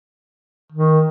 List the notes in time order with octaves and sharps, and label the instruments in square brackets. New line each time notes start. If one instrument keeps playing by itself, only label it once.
[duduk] D#3